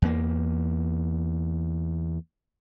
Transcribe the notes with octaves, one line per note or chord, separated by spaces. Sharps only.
E2 A#3